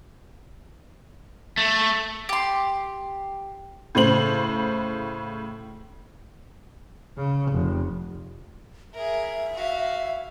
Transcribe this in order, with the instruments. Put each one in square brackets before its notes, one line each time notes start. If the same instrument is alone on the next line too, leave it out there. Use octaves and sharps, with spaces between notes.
[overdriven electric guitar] A3
[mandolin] G4 C6
[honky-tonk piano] A2 C#3 C5 F#7
[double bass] C#3
F1
[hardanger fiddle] G#4 A#4 [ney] E5
[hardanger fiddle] F#4 F5